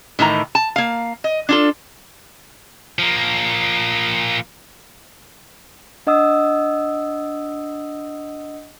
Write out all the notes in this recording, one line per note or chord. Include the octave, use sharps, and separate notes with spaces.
A2 D#3 E3 A#5
A5
A#3 F5
D#5
D4 F4 A4
F3 A#3
D4 D#5 F#5 D#6 E6